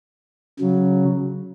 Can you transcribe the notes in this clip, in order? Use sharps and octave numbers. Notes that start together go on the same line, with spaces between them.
C#3 F#3